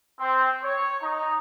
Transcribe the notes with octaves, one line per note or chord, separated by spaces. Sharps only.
C4
C#5
D#4